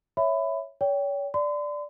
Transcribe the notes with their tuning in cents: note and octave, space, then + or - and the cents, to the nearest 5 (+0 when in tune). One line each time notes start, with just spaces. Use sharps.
C#5 +0 E5 +0 B5 +20
C#5 +35 G5 +0
D5 +0 C6 -45